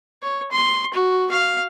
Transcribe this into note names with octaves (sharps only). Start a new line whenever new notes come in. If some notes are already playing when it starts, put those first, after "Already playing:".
C#5
C6
F#4
F5